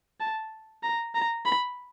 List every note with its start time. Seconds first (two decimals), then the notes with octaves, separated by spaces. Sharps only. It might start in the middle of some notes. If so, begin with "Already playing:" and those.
0.20 A5
0.83 A#5
1.15 A#5
1.46 B5